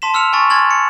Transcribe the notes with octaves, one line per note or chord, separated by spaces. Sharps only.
A5 C6 B6 E7
C6 E6 F6 C#7 F7
G#5 B5 C#6 A6
G#5 C6 F6 G#6 A6 F#7
C#7